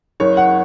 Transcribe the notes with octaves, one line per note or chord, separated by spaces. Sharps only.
F#1 C#5
F#5